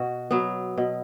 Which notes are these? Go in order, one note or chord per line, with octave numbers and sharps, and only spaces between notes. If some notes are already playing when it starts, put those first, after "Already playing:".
Already playing: B2 F#4
F#3 B3
B2